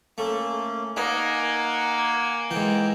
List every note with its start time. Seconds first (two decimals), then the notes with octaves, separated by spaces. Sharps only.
0.18 A3 A#3 C#4
0.96 A#3 D#4 F#5 G#5
2.51 G#2 E3 G5